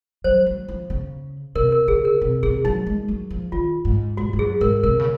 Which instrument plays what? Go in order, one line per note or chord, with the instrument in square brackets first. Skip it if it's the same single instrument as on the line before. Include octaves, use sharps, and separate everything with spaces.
[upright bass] F#3 [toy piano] C5
[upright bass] F#3
F3
C#3
[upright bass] C3 [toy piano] A#4
[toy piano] A#4
[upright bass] C#3 [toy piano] G#4
[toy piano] A#4
[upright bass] C3
[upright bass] C3 [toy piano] G#4
[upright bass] F#3 [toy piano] D#4
[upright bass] G#3
F#3
F3
[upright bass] D#3 [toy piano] F4
[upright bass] G#2
[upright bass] G#2 [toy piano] F#4
[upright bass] G#2
[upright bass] F#2 [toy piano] G#4
[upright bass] G#2 [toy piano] A#4
[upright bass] C3 [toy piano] A#4
[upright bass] C#3